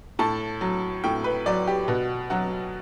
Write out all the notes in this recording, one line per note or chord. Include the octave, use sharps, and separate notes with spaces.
A2 A5
F#3
A2 G5
B4
F#3 D5
G4
B2 F#4
F#3 F#4